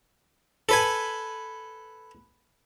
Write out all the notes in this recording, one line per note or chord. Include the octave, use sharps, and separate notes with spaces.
A4 B4 G#5